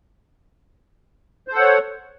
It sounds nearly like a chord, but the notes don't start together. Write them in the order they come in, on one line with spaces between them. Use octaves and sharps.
C5 A4 F#5 C#5